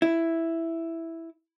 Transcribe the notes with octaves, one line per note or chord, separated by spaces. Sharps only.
E4